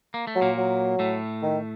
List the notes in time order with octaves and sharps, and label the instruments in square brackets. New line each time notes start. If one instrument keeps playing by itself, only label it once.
[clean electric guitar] A#3
A3
[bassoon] F#3
[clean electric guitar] A#2 A#3
[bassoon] F#3
[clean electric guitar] A2 A3
[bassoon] D#3